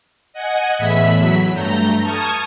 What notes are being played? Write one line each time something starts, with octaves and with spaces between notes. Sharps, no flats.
D#5 F#5 G#5
E2 A2 E5 B5 B6
F#3
G2 A3 A#5 G6
A5 C#6 D#6 F6 G#6